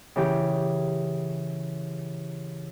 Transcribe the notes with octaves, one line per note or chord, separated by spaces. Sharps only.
C#3 E3 G4